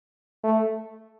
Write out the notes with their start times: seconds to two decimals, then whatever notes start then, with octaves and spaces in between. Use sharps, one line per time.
0.43 A3